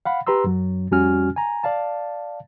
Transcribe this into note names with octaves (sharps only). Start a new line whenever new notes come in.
F5 F#5 B5
G4 B4 A#5 C6 E6
F#2 F#3
F2 G3 C#4 F#4 G#5 F6
G#5 A#5
D5 F5 A5